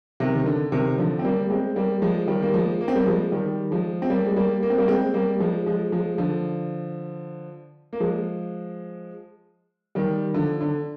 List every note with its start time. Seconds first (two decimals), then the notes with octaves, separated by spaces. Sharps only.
0.20 C3 D#3
0.35 D#3
0.46 D3
0.72 C3 D#3
0.98 D3 F3
1.19 C4
1.25 G3 A#3
1.50 G#3 C4
1.76 G3 A#3
2.02 F3 G#3
2.28 D#3 G3
2.42 A#3
2.54 F3 G#3
2.81 A#3
2.88 C4
2.95 G3 A#3
3.06 F3 G#3
3.32 D#3 G3
3.71 F3 G#3
4.02 C4
4.10 G3 A#3
4.26 G#3
4.36 G3 A#3
4.63 A#3
4.70 C4
4.78 G3 A#3
4.88 G#3 C4
5.14 G3 A#3
5.40 F3 G#3
5.67 F3 G#3
5.92 F3 G#3
6.18 D3 F3
7.93 A#3
8.00 F3 G#3
9.95 D#3 G3
10.34 D3 F3
10.61 D3